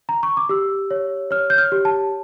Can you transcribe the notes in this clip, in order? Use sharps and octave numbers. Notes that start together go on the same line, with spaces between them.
A#5
C#6
D6
G4 E6
C#5
C#5 F6
G6
F6
G4
A5